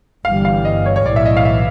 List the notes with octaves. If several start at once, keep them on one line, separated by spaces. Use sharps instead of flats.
G1 G2 E3 G3 F5
F5
D#5
C#5
C#5
B1 A2 E3 D5
E5
D#5
F5
E5